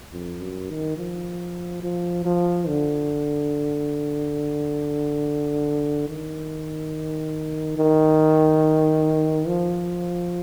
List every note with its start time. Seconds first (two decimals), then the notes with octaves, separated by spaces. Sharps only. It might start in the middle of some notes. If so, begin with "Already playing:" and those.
0.12 F2
0.41 F#2
0.70 D#3
0.98 F3
1.83 F3
2.25 F3
2.68 D3
6.08 D#3
7.77 D#3
9.48 F3